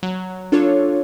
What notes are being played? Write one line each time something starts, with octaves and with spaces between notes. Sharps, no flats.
F#3
D4 F4 A4 C#5